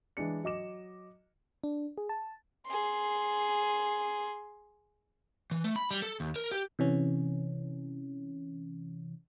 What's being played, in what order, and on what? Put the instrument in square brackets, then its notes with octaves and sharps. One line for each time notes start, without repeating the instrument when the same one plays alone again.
[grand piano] E3 G#3 D4 C#7
F#3 D#5 D6 E7
[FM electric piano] D4
G#4
A5
[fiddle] G#4 C6
[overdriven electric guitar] E3
A3
B5
G3
A4
D#2
A#4
G4
[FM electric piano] C3 E3 C#4